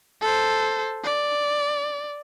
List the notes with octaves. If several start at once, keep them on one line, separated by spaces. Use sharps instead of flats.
A4 C5
D5